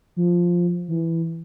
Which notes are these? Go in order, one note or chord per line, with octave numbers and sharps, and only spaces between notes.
F3
E3